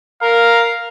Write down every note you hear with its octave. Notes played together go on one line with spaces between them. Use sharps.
A#4 F5